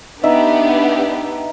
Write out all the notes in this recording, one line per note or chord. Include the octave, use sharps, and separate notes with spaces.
B3 D4 D#4 G4 E5